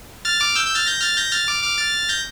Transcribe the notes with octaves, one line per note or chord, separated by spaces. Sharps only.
F6 A6
D6 F6
E6 G6
E6 G6
F6 A6
G6 A#6
F6 A6
G6 A#6
F6 A6
D6 F6
D6 F6
F6 A6
G6 A#6